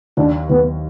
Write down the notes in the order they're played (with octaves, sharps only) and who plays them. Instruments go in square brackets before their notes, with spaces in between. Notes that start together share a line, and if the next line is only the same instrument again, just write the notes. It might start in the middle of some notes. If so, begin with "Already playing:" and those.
[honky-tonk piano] D#2 [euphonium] D4
[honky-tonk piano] D#2 [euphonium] B3